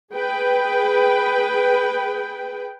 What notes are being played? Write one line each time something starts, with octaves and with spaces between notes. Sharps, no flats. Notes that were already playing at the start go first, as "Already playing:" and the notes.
G#4 B4 G5